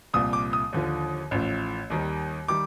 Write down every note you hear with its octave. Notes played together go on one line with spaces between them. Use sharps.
C2 A#2 F3 D#6
D6
D#6
D#2 D3 F3
A1 A2 F3
D#2 D#3 G3
D#3 G3 D6